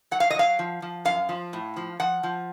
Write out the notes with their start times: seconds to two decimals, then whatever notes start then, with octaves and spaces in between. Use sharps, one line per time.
0.11 F#3 F#5
0.20 F5
0.30 D#5
0.35 F#3 F5
0.59 F3
0.82 F3
1.05 F#2 F5
1.29 F3
1.53 A2
1.76 F3
2.00 F3 F#5
2.23 F3